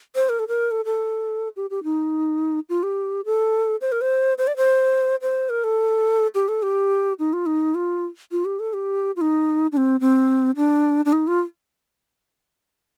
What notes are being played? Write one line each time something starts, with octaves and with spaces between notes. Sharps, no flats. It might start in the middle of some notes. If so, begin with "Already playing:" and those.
C5
A#4
A4
A#4
A4
A4
G4
G4
D#4
F4
G4
A4
C5
A#4
C5
C5
D5
C5
C5
A#4
A4
G4
A4
G4
D#4
F4
D#4
F4
F4
G4
A4
G4
F4
D#4
D4
C4
C4
D4
D4
D#4
F4